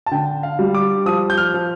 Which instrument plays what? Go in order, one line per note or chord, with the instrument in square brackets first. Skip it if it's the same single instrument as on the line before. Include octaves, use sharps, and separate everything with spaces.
[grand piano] A5
D3 G5
F5
G3
D6
F3 D#6
G6
F6
F3